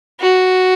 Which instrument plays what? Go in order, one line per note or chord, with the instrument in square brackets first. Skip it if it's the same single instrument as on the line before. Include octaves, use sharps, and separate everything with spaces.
[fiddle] F#4